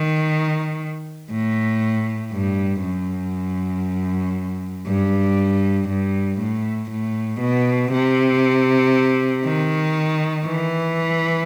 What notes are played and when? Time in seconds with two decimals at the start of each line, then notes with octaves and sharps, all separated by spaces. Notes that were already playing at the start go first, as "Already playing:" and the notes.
Already playing: D#3
1.31 A2
2.32 G2
2.82 F#2
4.87 G2
5.89 G2
6.40 A2
6.91 A2
7.41 B2
7.92 C3
9.45 D#3
10.46 E3